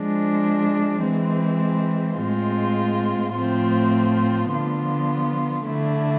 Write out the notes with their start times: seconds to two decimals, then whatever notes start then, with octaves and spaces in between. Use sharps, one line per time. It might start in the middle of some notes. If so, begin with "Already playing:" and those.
Already playing: F3 G#3 D4
1.03 E3 G#3 C4
2.19 A2 G#3 C4 F4
3.35 A2 F3 A3 C4 F4
4.51 D3 F3 B3 F4
5.67 D3 A3 E4